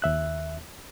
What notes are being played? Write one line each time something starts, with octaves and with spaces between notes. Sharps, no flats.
D#2 E5 F#6